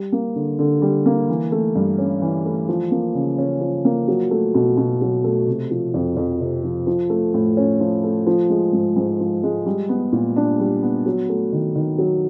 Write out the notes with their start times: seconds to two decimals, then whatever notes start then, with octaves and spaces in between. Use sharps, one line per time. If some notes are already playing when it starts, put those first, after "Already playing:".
Already playing: G3
0.12 A#3
0.36 D3
0.59 D3
0.82 G3
1.06 A#3
1.29 E3
1.52 A3
1.76 G2
1.98 C#4
2.22 E3
2.45 A3
2.69 F3
2.91 A#3
3.15 C#3
3.38 C#4
3.61 F3
3.85 A#3
4.08 F#3
4.31 A3
4.55 B2
4.77 B2
5.01 F#3
5.24 A3
5.47 C3
5.71 F3
5.94 F2
6.17 F2
6.41 C3
6.64 F3
6.87 F3
7.10 A3
7.34 A2
7.57 C#4
7.80 F3
8.04 A3
8.27 F3
8.50 G#3
8.73 G#2
8.96 G#2
9.20 F3
9.43 G#3
9.66 G3
9.89 B3
10.12 A#2
10.36 D4
10.59 G3
10.83 B3
11.06 F#3
11.29 A3
11.53 D#3
11.76 D#3
11.98 F#3